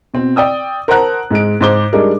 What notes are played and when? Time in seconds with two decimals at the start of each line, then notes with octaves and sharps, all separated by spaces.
0.14 B2 C4
0.36 D5 G5 D#6 E6
0.88 A#4 C5 F#5 A5 A#5 F#6
1.31 G#2 G#3 D7
1.61 G#2 G#4 C5 D6 G7
1.93 G3 G#3 D4 D#4 G#4 A#4